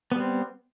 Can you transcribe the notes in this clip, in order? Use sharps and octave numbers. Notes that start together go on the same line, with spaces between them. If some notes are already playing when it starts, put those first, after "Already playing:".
G3 B3 C4